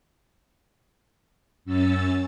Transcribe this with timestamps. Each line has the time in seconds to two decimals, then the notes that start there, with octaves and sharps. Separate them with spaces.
1.65 F#2 C#4 E6 A6